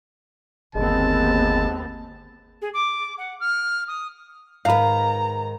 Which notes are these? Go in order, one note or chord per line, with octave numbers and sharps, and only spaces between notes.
G1 D#2 G#3 B3 C4 A5
G#4
D6
F#5
F6
D#6
G#2 D#3 B4 F5 A#5